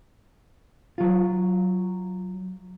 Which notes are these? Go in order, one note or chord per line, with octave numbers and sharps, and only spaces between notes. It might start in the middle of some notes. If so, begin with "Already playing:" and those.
F#3 F4